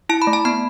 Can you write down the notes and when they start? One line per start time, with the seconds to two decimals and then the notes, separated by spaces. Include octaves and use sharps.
0.09 E4 A5
0.22 B5
0.27 A3
0.33 A5
0.45 B3 B5